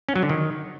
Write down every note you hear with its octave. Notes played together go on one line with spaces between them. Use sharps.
C#4
F#3
D3
D#3